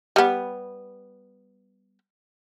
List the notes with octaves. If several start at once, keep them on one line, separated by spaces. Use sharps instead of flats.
G3 B3